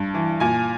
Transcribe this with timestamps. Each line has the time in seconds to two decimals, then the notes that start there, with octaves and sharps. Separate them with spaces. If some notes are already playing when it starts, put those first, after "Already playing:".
Already playing: G2
0.14 E3
0.40 A#2 G#5